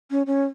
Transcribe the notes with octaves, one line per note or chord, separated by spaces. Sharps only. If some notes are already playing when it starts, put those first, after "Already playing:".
C#4
C#4